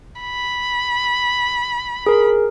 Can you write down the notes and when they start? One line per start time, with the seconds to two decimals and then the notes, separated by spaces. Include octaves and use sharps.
0.22 B5
2.06 G#4 A#4